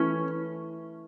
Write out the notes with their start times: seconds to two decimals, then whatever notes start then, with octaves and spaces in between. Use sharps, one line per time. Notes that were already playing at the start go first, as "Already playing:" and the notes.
Already playing: E3 A3 C#4